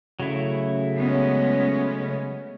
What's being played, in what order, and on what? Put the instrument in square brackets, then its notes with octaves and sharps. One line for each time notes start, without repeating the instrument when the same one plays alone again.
[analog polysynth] C#3 [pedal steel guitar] F#3 A3 E4
[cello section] G#3 B3 C#4